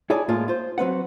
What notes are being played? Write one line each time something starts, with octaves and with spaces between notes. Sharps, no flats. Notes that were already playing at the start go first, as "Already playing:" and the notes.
E4 G#4 C#5 D5 G#5 A5
A2 G#3 A#3 F4
F4 C5
F#3 C4 B4 F#5